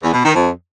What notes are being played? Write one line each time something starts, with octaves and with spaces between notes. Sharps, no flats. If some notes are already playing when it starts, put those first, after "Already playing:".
E2
B2
D#3
F2